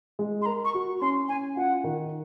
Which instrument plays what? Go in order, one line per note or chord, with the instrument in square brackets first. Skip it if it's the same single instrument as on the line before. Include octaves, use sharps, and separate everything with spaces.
[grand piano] G#3
[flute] C6
[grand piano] A#4 [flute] A#5
[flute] C#6
[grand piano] F#4
[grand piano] C#4 [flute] C6
[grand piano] C#4 [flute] G#5
[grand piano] F4 [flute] F#5
[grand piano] D#3